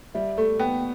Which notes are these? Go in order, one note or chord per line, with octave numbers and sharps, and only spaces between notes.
G3 E5
A3 A4
B3 G5